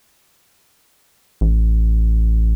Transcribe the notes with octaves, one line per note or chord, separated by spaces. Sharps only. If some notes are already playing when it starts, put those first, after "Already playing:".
A1